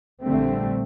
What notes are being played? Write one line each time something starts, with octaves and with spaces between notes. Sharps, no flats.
A#1 D3 G3 A3 C4